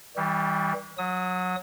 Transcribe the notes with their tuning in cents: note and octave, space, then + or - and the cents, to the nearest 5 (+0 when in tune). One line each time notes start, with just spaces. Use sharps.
E3 -35 G3 +0
F#3 -20 D#6 +20